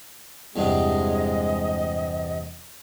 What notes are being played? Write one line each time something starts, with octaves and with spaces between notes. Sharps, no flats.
E2 G2 C3 G#3 D#5